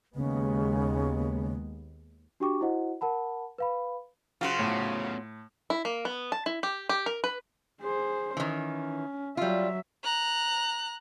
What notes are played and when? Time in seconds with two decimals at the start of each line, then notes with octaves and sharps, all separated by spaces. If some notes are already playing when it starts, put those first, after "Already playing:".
0.15 D#2 C#3 G#3 B3
2.40 D4 F#4 G4 G5 C#6 D6
2.61 E4 F#4 C5 D#5 F#5
3.01 A#4 F#5 A5 B5
3.58 B4 F5 B5
4.41 C#3 F#3 F4 F#4 C5
4.59 A2 A3 B3 C#5
5.70 E4
5.85 A#3
6.05 B3
6.32 A5
6.46 E4
6.63 G4
6.89 G4
7.06 A#4
7.24 B4
7.81 G#4 C5
8.37 D#3 E3 C#4
9.37 F#3 G3 F4 E5
10.04 A#5 F#6